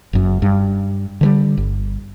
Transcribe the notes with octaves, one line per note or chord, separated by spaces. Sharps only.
F#1 F#2
G2
D3 E3 G3
G1